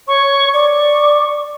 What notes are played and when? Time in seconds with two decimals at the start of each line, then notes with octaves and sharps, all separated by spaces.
0.08 C#5 C#6
0.54 D5 C#6 D6